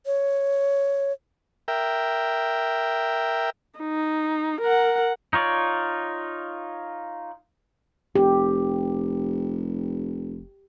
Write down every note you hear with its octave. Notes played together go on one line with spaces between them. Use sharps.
C#5
A#4 E5 G5
D#4
A#4 F#5
D#4 F4 C#5 D5
F1 G4